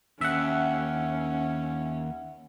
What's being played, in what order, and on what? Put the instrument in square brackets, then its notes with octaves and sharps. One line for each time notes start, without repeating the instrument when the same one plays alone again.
[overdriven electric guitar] D#2 [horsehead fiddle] C#4 [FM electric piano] E5 F#5